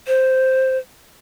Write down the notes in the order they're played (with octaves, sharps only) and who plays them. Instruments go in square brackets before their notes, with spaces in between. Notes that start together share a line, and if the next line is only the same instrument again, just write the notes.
[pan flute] C5